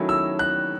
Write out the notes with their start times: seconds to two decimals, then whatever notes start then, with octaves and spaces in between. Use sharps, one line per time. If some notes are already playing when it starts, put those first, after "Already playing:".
Already playing: D#3 F#3 A3 C#4 E4
0.09 E6
0.39 F#6